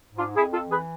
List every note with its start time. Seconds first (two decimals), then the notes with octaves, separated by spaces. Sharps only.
0.10 G#2
0.18 D4 F4
0.36 F2 E4 G#4
0.53 F4 A4
0.63 E3
0.70 G#4 B4